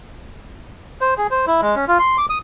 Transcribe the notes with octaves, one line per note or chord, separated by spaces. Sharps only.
C5
G#4
C5
E4
G#3
C#4
F4
C6
D6
D#6